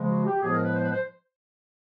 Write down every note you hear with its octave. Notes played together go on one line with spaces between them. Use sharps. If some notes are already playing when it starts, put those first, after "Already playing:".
Already playing: C#3 F3 G#3
F#4
G4
A2 F3 G#3 B3 G#4
A#4
B4
C5
B4
C5